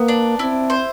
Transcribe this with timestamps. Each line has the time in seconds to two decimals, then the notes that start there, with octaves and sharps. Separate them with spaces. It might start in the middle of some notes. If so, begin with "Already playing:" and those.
Already playing: A#3 B3
0.08 D4
0.39 C4 E4
0.70 C5